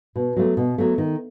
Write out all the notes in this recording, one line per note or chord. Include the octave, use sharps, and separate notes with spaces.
B2
F#3 A3
B2
F#3 A3
D#3